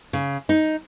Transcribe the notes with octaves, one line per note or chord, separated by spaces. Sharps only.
C#3
D#4